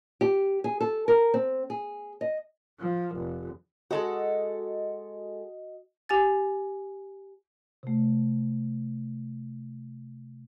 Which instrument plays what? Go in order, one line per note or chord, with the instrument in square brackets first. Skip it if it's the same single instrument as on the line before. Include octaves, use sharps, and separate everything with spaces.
[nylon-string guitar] G4
G#4
A4
A#4
C4
G#4
D#5
[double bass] F3
F1
[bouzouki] G#3 A4 F#5 [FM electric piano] F#4 D#5
[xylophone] G4 G#5 A6
[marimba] C3 A3